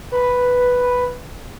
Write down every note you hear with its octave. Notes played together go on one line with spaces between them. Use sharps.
B4